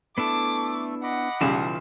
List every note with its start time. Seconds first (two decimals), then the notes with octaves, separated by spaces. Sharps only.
0.18 A3 B3 D4 E4 A4 D6
1.03 D#5 F#5 B5 D6
1.41 B1 C#3 E3 G3 F4 A5